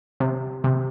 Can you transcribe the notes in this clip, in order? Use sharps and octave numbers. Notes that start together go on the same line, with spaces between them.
C3
C3